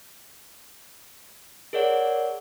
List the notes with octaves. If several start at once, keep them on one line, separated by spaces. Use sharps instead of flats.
G#4 A#4 C#5 D5 F#5